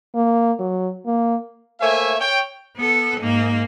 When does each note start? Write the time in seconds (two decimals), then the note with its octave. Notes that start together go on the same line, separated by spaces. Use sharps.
0.15 A#3
0.59 F#3
1.06 A#3
1.81 A3 A#3 C5 C#5 E5 G#5
2.20 C#5 G5
2.77 B3 A4
3.20 G#2 A#3